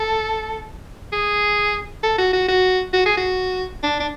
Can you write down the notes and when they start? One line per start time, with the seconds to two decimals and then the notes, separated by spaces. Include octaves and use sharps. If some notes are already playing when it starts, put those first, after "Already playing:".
Already playing: A4
1.12 G#4
2.03 A4
2.18 F#4
2.33 F#4
2.48 F#4
2.93 F#4
3.06 G#4
3.17 F#4
3.83 D4
4.00 D4